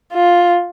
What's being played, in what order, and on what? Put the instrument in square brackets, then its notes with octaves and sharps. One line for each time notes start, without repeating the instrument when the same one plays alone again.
[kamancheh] F4